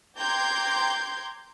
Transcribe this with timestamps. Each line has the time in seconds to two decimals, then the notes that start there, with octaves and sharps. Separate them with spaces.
0.19 G5 A#5 C6 D6 G6 G#6